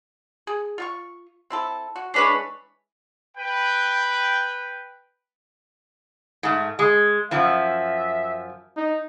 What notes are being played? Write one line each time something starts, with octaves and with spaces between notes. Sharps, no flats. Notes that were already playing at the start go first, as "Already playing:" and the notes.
G#4
F4 F5 C#6
C4 E4 A4
F#4
E3 G#3 C#4 D4 B4 C#5
B4 G5
G#2 A3
G#3
F#2 F3 E5
D#4